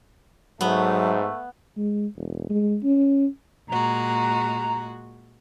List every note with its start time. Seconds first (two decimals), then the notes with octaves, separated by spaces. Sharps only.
0.61 G#2 F#3 A3 B3
1.77 G#3
2.16 E1
2.50 G#3
2.83 C#4
3.68 A#2 G#3 F#4 A#5